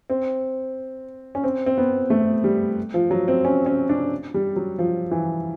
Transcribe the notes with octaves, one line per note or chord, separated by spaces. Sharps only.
C4
C#4
C4
C4
B3
A3
G3
F3
F#3
C4
C#4
C#4
D4
G3
F#3
F3
E3